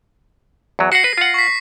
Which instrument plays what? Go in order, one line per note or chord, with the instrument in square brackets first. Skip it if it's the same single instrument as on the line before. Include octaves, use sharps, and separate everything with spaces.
[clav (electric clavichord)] E2 F#3
[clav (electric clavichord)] F#4 F#5 [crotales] A#6 C7
[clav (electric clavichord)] B4
F4 F#5
[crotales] C#6 B6